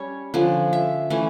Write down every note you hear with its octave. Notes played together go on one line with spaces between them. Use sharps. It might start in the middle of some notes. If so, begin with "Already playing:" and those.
Already playing: G3 C#4 C#5
D3 F3 C#4
E5
E3 A3 C#4